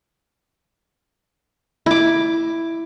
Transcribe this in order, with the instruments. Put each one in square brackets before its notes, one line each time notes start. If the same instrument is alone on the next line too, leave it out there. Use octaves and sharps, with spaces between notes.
[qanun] E4 D6